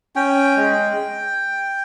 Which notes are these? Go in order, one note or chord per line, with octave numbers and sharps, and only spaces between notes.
C#4 G5
G#3